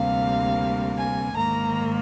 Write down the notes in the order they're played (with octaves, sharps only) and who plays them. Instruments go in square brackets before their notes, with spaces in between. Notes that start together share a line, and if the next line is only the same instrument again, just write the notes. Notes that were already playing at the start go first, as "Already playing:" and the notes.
Already playing: [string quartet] D2 C3 G3 A#3 F5
G#5
G#2 D#3 A#3 A#5